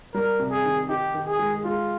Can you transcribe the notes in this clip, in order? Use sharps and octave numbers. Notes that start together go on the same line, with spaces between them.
G3 A#4
C3
G#4
D#3
D#4 G4
D#3
G#4
G#3
G#3 F4